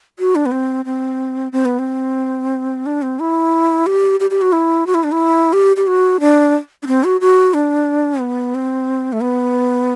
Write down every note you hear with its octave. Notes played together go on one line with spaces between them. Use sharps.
F#4
D4
B3
C4
C4
C4
B3
C4
D4
C4
E4
G4
G4
G4
F#4
E4
F#4
E4
D4
E4
G4
G4
F#4
D4
D4
C4
F#4
F#4
D4
B3
C4
A3
B3